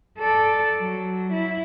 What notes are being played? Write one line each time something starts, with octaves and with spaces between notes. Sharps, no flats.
A4 D5
F#3
E4